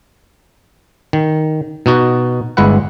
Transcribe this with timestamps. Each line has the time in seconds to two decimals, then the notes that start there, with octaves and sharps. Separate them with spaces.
1.13 D#3
1.86 B2 D#4 F#4
2.57 G1 G#3 E4 B4 F#5